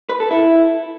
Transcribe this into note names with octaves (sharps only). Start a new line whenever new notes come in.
B4
A4
E4